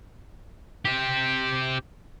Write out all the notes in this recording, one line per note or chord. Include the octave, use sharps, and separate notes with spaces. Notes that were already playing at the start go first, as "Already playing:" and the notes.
C4 G4